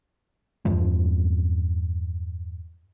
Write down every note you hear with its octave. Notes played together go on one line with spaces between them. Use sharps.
E2 G2 F3 G#3